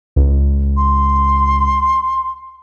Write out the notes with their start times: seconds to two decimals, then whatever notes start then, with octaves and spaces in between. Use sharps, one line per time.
0.16 C#2
0.76 C6